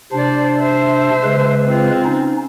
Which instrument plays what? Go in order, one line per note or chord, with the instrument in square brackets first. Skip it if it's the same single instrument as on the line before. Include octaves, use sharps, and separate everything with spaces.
[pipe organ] C3 D4 [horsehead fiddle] C5 D5
[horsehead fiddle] C5 E5
[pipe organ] C#3 G#3 B4
[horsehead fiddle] C4 F4
[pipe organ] C#4 D#4